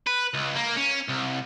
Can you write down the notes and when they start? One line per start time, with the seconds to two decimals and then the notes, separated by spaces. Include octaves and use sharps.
0.07 B4
0.34 C#2
0.56 A#3
0.77 C#4
1.09 C2